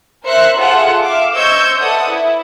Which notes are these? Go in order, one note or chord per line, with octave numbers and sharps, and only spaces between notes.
A#4 C5 E5 F#6 C7 C#7
F4 G#4 A4 E5 F#5
E5 F5 D6
C5 D#5 C#6 E6 G6 G#6
A4 B4 D5 E5 F#5 D#6
E4